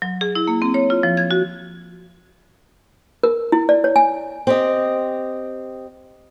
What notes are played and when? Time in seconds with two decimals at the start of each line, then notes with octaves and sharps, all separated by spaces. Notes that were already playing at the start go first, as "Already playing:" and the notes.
0.02 F#3
0.21 G#4
0.35 E4
0.47 A#3
0.62 C4
0.74 C#5
0.90 F4
1.03 F3
1.17 G#6
1.31 F#4
3.23 A#4
3.52 E4
3.69 D5
3.84 C#5
3.96 G#5
4.47 C4 G4 D#5